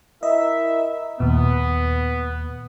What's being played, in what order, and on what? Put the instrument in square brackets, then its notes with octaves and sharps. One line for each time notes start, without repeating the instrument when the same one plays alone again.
[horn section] E4 A#4 E5 [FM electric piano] D#5
[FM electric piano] D#2 A#2 [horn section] B3